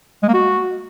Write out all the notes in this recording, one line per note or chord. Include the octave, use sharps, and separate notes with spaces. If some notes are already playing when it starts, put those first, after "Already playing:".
G#3
A#3
F#4